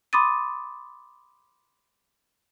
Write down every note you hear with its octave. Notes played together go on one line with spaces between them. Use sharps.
B5 C6 D6 D#6 A6 D#7